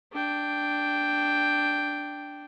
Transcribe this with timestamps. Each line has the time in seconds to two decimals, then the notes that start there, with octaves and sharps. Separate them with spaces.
0.13 D4 G5